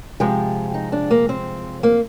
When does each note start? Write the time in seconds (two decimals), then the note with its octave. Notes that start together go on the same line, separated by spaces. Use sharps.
0.20 C3 F3 G#3 G4
0.74 D#4
0.92 D4
1.10 A#3
1.29 C4
1.83 A#3